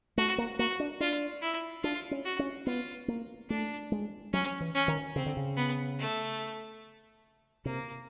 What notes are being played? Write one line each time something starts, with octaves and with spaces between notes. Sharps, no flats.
A3 F#4
A#3
A#3 F#4
D4
D4 F4
E4
D4 F4
C#4
F#4
C#4
B3 F4
A#3
A3 D4
G#3
F#3 C#4
E3
C#4
D#3
C#3 C4
D3
C#3
B3
A3
C3 A#3